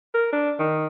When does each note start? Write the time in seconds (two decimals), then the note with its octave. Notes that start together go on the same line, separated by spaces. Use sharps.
0.14 A#4
0.32 D4
0.59 D#3